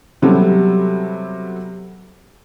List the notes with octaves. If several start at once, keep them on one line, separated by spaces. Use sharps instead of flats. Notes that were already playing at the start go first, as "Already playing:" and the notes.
C3 F#3 G3 B3 A4